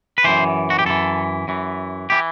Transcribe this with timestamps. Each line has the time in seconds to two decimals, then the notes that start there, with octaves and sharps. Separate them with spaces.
0.18 B4
0.24 F#2 E3 C5
0.70 F#4
0.79 G4
0.86 F#2 E3 A4
1.48 F#2 E3
2.10 E3 G4